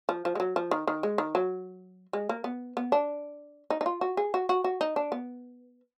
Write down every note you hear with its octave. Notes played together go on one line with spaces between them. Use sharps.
F3
F3
G#3
F#3
F3
D#3
D#3
G#3
D#3
F#3
G#3
A#3
B3
B3
D4
D#4
D#4
F4
F#4
G#4
F#4
F#4
F#4
D#4
D4
B3